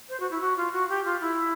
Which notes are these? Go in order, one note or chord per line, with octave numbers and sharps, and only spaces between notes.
C5
F#4
E4
F#4
F4
F#4
G4
F4
E4